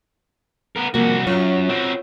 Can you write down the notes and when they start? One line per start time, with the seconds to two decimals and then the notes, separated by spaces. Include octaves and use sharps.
0.76 B3 A#4
0.94 C2 F3 A#3 F#4
1.27 F#2 F4 C#5
1.69 C4 F#4